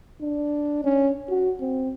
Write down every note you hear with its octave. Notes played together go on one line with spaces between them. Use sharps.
D4
C#4
F#4
C4